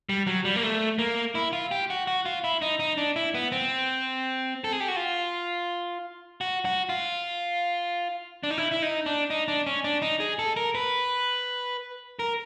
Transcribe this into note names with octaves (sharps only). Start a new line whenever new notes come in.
G3
F#3
G3
A#3
A3
A#3
E4
F4
G4
F#4
F#4
F4
E4
D#4
D#4
D4
E4
B3
C4
A4
G#4
G4
F#4
F4
F#4
F#4
F4
D4
D#4
E4
E4
D#4
D4
D#4
D4
C#4
D4
D#4
G#4
A4
A#4
B4
A#4